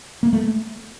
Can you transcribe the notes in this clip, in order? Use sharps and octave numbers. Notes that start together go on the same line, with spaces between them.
A#3
A3